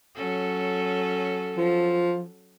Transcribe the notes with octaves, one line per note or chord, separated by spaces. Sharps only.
F#3 C#4 A4
F3